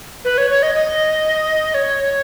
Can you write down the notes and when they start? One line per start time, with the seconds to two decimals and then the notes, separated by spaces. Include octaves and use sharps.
0.25 B4
0.38 C#5
0.50 C#5
0.63 D#5
0.75 D#5
1.74 C#5